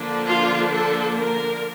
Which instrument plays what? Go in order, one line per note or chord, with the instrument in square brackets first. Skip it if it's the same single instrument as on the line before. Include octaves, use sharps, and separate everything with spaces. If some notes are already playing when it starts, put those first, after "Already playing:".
Already playing: [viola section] D3 F3 A#3 D4
F4
A4
A#4